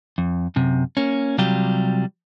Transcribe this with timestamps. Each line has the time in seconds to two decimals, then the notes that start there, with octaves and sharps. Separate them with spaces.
0.18 F2
0.56 F#2 C3
0.97 A#3 C#4
1.38 C3 F#3 G3 F4 G4